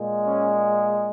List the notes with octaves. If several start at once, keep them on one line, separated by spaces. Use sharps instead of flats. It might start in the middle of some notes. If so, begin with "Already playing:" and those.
Already playing: A#2 G#3
C#4